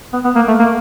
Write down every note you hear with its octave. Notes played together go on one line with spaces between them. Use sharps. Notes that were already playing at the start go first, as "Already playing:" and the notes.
B3
B3
A#3
A3
A#3